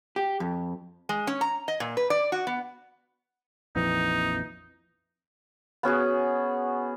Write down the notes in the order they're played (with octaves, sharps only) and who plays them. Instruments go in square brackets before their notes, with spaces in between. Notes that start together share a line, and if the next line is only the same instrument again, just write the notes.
[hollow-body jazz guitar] G4
F2
[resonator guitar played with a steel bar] G#3
C#4
A#5
D#5
A#2
B4
D5
F#4
B3
[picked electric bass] A#1 F2 E3 [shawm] D#4
[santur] B3 C#4 F#4 G#4